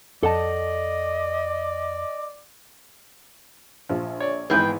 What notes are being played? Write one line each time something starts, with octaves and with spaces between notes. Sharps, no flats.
F2 A4 D5 D#5 F#5 A5
A#1 F3
C#5 D5
G#1 G#2 E3 B3 G#4 B4 G5